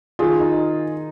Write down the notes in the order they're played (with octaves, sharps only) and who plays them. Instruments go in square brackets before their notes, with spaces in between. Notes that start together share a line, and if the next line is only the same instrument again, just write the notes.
[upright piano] D#3 [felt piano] F4 G#4
[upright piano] D#4